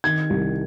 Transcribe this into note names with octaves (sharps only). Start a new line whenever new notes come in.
D#3 G#6
C2